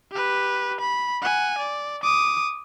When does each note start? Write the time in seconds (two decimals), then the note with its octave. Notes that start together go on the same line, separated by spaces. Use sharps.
0.12 G4 B4
0.80 B5
1.22 F#5 G#5
1.58 D5
2.03 D6 D#6